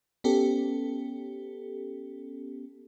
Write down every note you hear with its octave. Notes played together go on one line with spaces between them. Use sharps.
B3 C#4 G4 A4